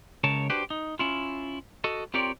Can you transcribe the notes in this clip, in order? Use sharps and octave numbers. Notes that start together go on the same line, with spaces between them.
C#2 C#3 A#4 C#5 A5
D4 F#4 G4 B4 C5
D#4
C#4 E4 F4
F#4 A4 D#5
C4 F4 G4 A#4 C#5 D5